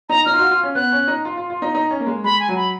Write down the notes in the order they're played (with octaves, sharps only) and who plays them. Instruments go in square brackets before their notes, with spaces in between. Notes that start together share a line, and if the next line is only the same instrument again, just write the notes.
[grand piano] D#4 [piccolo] A#5
[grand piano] D#4 [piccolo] F6
[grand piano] F4
F#4
F4
C#4
[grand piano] B3 [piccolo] F#6
[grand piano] C#4
D#4
F4
F4
F4
D#4
D#4
C#4
A#3
G#3
[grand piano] G#3 [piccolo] B5
[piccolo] G#5
[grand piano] F#3
[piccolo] B5